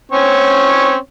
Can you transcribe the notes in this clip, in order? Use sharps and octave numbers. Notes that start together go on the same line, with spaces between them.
C4 C#4 C#5